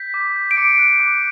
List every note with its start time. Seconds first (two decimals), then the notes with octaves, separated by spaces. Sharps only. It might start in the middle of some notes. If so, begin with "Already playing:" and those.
Already playing: G6 B6
0.14 D6
0.36 G6
0.51 D7
0.57 D6 C#7
0.79 F#6
1.00 D6